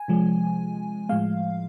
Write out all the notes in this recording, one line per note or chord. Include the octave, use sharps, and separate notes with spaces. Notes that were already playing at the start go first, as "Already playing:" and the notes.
Already playing: G#5
C3 F3 G#3
A2 F3 G#3 F5